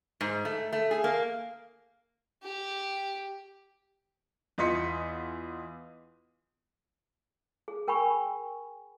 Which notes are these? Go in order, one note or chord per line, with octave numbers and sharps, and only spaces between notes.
G#2
A3
A3
G#4
A#3
G4
E2 F4 D#5 C6 B6 C#7
G#4
A#4 G5 G#5 B5 C#6